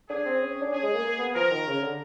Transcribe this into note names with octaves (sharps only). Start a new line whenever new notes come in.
D4 G#4
C4
C#4
C#4
D4
C#4 G#4
G#3
A#3
A#3
B3
F3 A#4
D#3
C#3
D3